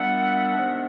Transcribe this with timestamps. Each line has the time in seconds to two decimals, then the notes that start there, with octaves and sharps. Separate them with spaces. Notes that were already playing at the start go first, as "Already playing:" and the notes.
Already playing: A#2 G3 B3 D4 E5 F#5
0.54 C3 D#3 G#3 B3 D4